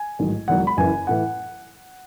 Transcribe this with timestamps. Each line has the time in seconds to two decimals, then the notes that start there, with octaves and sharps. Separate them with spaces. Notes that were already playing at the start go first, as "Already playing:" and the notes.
Already playing: G#5
0.19 A1 G#2 D#3 F#3
0.48 E1 E2 D#3 F#3 F#5
0.67 B5
0.77 F#1 F#2 E3 G#5
1.07 A2 E3 F#5